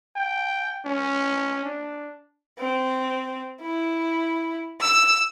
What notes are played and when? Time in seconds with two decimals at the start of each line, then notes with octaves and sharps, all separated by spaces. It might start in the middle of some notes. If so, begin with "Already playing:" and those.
0.16 G5
0.86 C#4
1.65 D4
2.59 C4
3.61 E4
4.80 E6